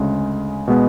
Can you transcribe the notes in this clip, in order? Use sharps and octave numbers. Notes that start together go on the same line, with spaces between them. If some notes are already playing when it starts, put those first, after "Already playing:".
Already playing: D2 C#3 G#3
B2 G#3 B3